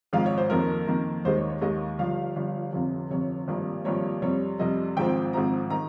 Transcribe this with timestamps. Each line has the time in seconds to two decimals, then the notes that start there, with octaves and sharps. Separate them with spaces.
0.13 G#1 G#2 F3 G#3 F5
0.26 C#5
0.38 C5
0.50 F2 D#3 A#3 A#4
0.87 F2 D#3 A#3
1.25 D#2 D#3 G#3 C5
1.37 C#5
1.50 C#5
1.61 D#2 D#3 G#3 D#5
1.99 G1 G2 F3 F5
2.36 G1 G2 F3
2.73 G1 F2 C3
3.10 G1 F2 C3 C#5
3.48 G#1 G2 F3 A#3
3.85 G#1 G2 F3 A#3 C#5
4.22 F2 C3 G3 C#5
4.59 F2 C3 G3 D#5
4.97 G#1 G#2 F3 C4 G5
5.33 G#1 G#2 F3 C4 A#5
5.70 D#3 A#5